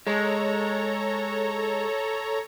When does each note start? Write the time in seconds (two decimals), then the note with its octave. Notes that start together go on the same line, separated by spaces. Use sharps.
0.07 G#3 A4 C#5 A#5